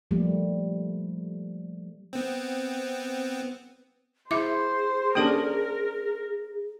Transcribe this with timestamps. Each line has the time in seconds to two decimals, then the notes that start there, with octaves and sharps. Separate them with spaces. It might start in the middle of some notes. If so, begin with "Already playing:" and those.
0.11 F3 G3 A3 A#3
2.13 B3 C4
4.31 E4 G#4 C5 E5 D6
5.15 A#3 C#4 D4 G4 A4 A#4 D#6